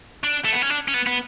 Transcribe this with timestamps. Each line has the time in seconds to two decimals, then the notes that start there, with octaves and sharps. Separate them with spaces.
0.24 D4
0.45 A3
0.53 B3
0.62 C#4
0.70 D4
0.88 C#4
0.94 B3
1.07 B3